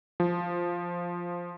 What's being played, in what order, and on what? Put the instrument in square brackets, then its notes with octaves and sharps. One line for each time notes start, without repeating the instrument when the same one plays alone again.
[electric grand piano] F3